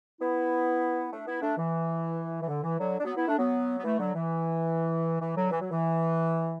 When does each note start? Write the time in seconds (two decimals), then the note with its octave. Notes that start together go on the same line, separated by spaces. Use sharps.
0.21 B3 E4
1.11 A3 D4
1.27 B3 E4
1.41 A3 D4
1.57 E3
2.41 E3
2.48 D3
2.63 E3
2.79 D3 F#3
2.99 D4
3.05 F#3 B3
3.16 B3 E4
3.28 A3 D4
3.38 F#3 B3
3.78 B3
3.84 E3 A3
3.99 D3 F#3
4.14 E3
5.20 E3
5.36 D3 F#3
5.51 E3
5.61 F#3
5.71 E3